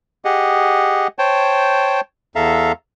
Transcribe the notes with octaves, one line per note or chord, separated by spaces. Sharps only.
G4 G#4 D#5 F#5
C5 C#5 G5 A5
E2 A4 E5 F5 A#5